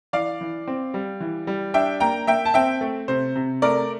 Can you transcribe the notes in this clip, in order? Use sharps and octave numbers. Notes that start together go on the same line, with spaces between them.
E3 D5 F5
E3
C4
G3
E3
G3
D4 E5 G5
A#3 G5 A#5
A#3 E5 G5
A5
C4 E5 G5
A3
C3 C5
C3
A3 A#4 D5